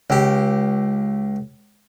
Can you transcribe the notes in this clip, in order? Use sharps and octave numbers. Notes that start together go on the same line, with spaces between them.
C#2 G4